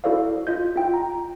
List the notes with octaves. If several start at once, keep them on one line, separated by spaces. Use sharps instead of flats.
E4 F#4 A4 C5 D5 F5
F4 D#5 G6
F4 G5
A#5